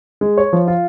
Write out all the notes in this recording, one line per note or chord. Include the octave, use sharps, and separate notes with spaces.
G#3
C#5
F3
F4